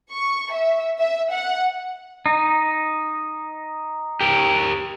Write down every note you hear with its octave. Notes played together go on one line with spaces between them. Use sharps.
C#6
E5
E5
F#5
D#4
G4 A#4